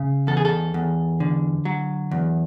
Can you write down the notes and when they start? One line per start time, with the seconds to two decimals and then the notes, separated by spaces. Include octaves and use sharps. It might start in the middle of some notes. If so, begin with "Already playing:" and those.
Already playing: C#3
0.27 E2 A4
0.37 G#4
0.45 A4
0.74 E2
1.20 D3
1.65 F#3
2.11 E2